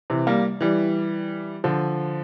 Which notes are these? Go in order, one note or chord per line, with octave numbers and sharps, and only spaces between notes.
C3 E3
G3 A#3
E3 G3
D3 F3